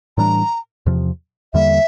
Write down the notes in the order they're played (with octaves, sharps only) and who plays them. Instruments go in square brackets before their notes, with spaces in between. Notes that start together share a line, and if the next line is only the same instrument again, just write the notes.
[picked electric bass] A2 E3 G3 D4 [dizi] A#5
[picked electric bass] E2 C3 F3
[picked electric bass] E2 D3 G3 A#3 [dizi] E5